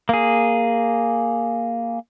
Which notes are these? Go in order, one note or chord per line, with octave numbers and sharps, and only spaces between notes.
A#3 G#4